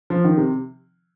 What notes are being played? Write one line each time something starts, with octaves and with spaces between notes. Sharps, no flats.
F3
D#3
C3